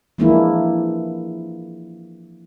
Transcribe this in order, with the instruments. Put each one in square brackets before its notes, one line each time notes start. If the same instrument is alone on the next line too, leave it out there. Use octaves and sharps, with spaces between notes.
[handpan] E3 F3 G#3 A#3 D4 E4